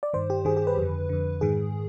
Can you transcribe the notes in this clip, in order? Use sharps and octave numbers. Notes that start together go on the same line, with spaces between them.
D5
G2 D#3 C5
G4
G2 D#3 G#4
G#4
B4
F2 D3
F2 D3
G#2 D#3 G#4